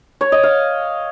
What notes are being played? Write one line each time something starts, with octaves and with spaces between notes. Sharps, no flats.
C#5
D#5
F5